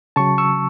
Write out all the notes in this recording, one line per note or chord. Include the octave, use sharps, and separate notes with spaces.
C#3 F#3 A5 C#6
C#6 E6